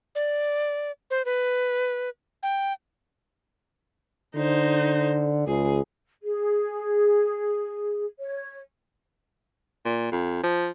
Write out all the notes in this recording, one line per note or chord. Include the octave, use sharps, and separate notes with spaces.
D5
C5
B4
G5
D3 D#4 C5
C#2 G#4
G#4
C#5
A#2
F2
F3